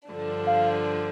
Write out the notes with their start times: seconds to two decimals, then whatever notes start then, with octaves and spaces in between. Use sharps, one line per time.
0.10 G2 D3 F3 D4
0.47 F5